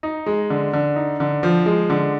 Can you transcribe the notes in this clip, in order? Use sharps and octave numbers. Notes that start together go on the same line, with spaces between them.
D#4
G#3
D3
D3
D#4
D3
F3
G#3
D3